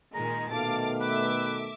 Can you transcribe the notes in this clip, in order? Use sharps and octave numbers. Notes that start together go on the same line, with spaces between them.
A#2 D#3 G#3 A#5
B2 D#3 A3 F5 A5 D6
B4 E5 D6